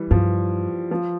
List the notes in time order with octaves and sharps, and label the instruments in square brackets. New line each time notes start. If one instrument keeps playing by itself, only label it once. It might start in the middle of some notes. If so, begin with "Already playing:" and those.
Already playing: [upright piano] E3 G3
[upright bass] G2 [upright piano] F3
[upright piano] F3